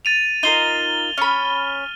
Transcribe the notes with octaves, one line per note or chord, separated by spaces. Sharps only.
A6 D#7 F7
D#4 F4 A#4 D#7 G7
C#4 B5 F6